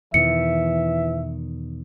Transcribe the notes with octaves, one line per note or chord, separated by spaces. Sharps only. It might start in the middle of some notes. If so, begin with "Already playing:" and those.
E2 B2 D#3 E3 E5 C#7